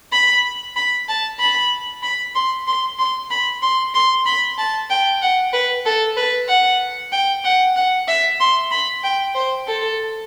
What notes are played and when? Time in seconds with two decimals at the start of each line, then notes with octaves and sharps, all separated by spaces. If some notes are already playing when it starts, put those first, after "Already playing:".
0.12 B5
0.76 B5
1.08 A5
1.40 B5
2.03 B5
2.35 C6
2.67 C6
2.99 C6
3.31 B5
3.62 C6
3.94 C6
4.26 B5
4.58 A5
4.90 G5
5.22 F#5
5.53 B4
5.86 A4
6.17 B4
6.48 F#5
7.12 G5
7.44 F#5
7.76 F#5
8.08 E5
8.40 C6
8.71 B5
9.03 G5
9.35 C5
9.67 A4